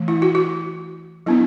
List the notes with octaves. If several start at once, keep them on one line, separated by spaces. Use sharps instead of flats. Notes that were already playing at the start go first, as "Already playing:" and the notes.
Already playing: E3 A3
E4
F#4
F#4
F#3 B3 D4 E4